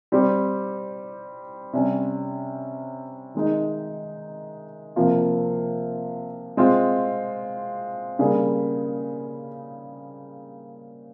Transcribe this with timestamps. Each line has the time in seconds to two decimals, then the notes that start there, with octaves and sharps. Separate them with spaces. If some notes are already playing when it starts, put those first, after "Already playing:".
0.12 G3 C4 G4
1.73 C3 G3 C#4
3.35 D#3 G#3 D#4
4.96 C3 F3 A#3 F4
6.57 G#3 C4 F4
8.19 C#3 G3 A#3 C#4 G#4